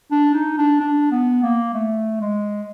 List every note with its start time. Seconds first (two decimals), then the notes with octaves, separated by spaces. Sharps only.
0.11 D4
0.34 D#4
0.58 D4
0.80 D4
1.12 B3
1.42 A#3
1.74 A3
2.21 G#3